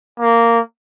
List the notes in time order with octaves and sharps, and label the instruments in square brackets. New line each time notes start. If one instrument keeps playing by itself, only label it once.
[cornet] A#3